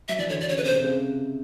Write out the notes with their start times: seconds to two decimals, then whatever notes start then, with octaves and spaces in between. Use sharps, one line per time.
0.08 F#3 E5
0.19 E3 D5
0.29 D3 C#5
0.40 D3 D5
0.49 C#3 C#5
0.57 B4
0.62 C3 C5
0.73 C3
0.84 C#3